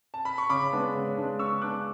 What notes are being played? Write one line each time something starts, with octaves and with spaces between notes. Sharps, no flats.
A5
B5
C#6
C#3 B5 D6
G#3 B3 D4
C#3
G#3 B3 D4
C#3 C#6 E6
G#3 B3 D4 D6 F#6